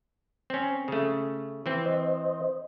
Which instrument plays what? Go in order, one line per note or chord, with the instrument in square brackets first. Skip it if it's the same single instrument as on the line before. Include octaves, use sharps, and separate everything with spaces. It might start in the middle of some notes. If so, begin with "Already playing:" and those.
[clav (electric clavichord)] C4 C#4
C#3 A3
E3 C4
[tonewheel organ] C5 D#5